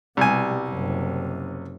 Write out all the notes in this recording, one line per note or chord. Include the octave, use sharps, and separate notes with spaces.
C2 B2 G3 G#5
F#1 C3